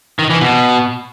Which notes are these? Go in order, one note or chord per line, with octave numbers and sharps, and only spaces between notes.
D#3
E3
B2